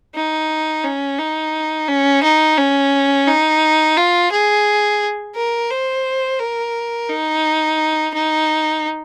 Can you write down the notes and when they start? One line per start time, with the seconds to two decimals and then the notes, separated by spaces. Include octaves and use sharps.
0.15 D#4
0.84 C#4
1.19 D#4
1.88 C#4
2.23 D#4
2.58 C#4
3.28 D#4
3.97 F4
4.32 G#4
5.35 A#4
5.71 C5
6.39 A#4
7.09 D#4
8.14 D#4